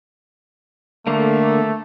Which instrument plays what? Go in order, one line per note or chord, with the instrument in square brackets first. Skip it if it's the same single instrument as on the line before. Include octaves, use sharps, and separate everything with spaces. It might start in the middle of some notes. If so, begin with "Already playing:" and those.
[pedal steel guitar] D3 A#3 [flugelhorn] A3